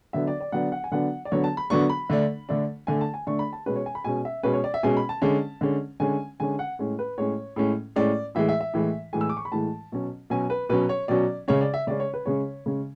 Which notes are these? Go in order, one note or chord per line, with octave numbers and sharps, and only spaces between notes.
D3 F#3 B3 D4 E5
D5
D5
D3 F#3 B3 D4 F#5
F#5
G#5
D3 F#3 B3 D4 F#5
D5
D3 F#3 B3 D4 C#5
A5
B5
D3 F#3 B3 D4 C#6
B5
D3 A3 D4
D3 A3 D4
D3 A3 D4 G#5
A5
G#5
D3 A3 D4 C#6
B5
A5
B2 G#3 C#4 B4
C#5
G#5
B5
B2 G#3 C#4 G#5
E5
B2 G#3 C#4 B4
C#5
D5
E5
B2 G#3 C#4 G#5
B5
A5
D3 G#3 C#4
D3 G#3 C#4
D3 G#3 C#4 G#5
D3 G#3 C#4 G#5
F#5
A2 G#3 C#4
B4
A2 G#3 C#4 C#5
A2 G#3 C#4
A2 G#3 C#4 D5
A2 E3 G#3 E5
E5
E5
A2 E3 G#3
A2 E3 G#3 G#5
E6
D6
C#6
B5
A2 E3 G#3 A5
B2 F#3 C#4
B2 F#3 C#4 G#5
B4
B2 F#3 C#4 B4
C#5
B2 F#3 C#4 D5
C#3 G#3 C#4 C#5
D5
E5
C#3 G#3 C#4 D5
C#5
B4
C#3 G#3 C#4 C#5
C#3 G#3 C#4